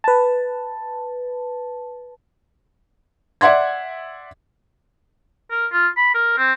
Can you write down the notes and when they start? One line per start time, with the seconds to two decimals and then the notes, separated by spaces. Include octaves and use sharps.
0.04 B4 A5
3.41 D5 E5 F#5 C6 G#6
5.51 A#4
5.72 F4
5.97 B5
6.14 A#4
6.38 C4